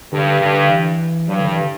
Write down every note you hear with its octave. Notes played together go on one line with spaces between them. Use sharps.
G2 D3
G2 D3
E3
G2 F#3
D3
E3
D3